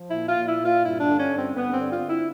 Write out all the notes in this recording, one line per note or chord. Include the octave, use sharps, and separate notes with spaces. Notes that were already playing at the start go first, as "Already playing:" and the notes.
Already playing: F3
A#2 E4
F4
A#2
E4
A#2
F4
G2 E4
D4
D3
C#4
G2
C4
G2 B3
C4
D3
F4
D3
E4